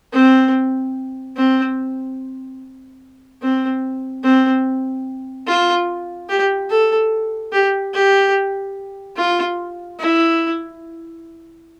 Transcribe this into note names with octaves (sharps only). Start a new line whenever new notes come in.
C4
C4
C4
C4
F4
G4
A4
G4
G4
F4
E4